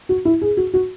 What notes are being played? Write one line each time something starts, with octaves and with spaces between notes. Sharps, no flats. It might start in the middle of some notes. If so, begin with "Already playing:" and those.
F#4
E4
G#4
F#4
F#4